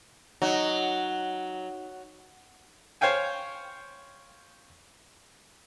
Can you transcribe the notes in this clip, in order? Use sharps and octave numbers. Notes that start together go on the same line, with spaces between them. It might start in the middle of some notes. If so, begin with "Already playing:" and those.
F#3 D#4
C5 C#5 F5 G5 G#5